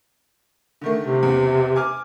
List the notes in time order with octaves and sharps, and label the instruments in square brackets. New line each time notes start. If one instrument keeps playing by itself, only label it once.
[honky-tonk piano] D3 D#3 A3
[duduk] C3
[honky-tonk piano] E2 C#3
G#5 D6 F6